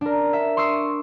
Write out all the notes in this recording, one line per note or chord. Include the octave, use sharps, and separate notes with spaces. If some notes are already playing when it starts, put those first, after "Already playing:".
D4 A#4
E5
C6 C#6 D#6 E6 C7 D7